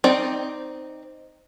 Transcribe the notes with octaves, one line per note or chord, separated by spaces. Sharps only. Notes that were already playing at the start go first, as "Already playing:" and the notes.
C4 D#4 D5